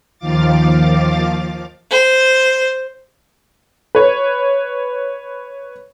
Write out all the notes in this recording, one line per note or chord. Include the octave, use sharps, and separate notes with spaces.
D#2 D#3 F3 F5 D6 A6
C5
B4 C#5